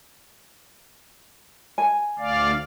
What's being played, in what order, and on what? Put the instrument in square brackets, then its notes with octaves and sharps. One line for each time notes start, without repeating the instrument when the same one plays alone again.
[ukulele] G#5
[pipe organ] D2 D5 F5